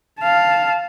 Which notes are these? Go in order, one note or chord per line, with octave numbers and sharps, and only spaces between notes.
F5 A5